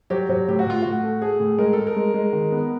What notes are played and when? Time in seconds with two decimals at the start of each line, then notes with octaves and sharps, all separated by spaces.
0.10 F#3 G4
0.29 F#3
0.48 A2 G4
0.59 F#4
0.66 A2 F4
0.82 A2 F#4
1.03 A3
1.22 A3 G#4
1.40 A2
1.58 G#3 A#4
1.73 G#3 A4
1.87 A#4
1.96 G#3
2.14 G#3
2.33 D#3
2.52 B3